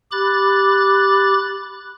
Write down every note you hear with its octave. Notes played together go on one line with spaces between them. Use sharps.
G4 B5 D6 F#6 A6